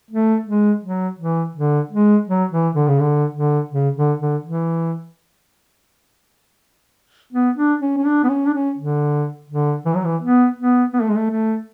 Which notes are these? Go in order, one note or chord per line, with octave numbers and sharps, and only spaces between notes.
A3
G#3
F#3
E3
D3
G#3
F#3
E3
D3
C#3
D3
D3
C#3
D3
D3
E3
B3
D4
C#4
C#4
D4
B3
C#4
D4
C#4
D3
D3
E3
F#3
E3
B3
B3
B3
A3
G#3
A3
A3